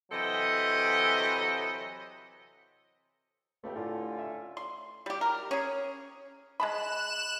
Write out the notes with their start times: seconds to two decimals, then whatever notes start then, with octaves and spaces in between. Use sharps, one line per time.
0.11 C3 E3 F#3 A4 D#5
3.64 C#2 A3 G4
3.76 A2 D3 C#4 F4
4.19 E5
4.57 C6
5.06 G3 G4
5.21 A#4
5.51 C#4 G#4
6.60 G#3 A5 B5 F#6 E7